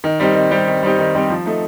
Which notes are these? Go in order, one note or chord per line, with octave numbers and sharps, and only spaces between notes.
D#3
G3 C4 D#4 G4
D#3
G3 C4 D#4 G4
D#3
G3 C4 D#4 G4
D#3
G3 C4 D#4 G4
F3
A3 D#4